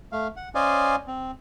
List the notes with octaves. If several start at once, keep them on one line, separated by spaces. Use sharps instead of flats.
A3 F5
F#5
C#4 C5 D5 D#5 F5 G#5
C4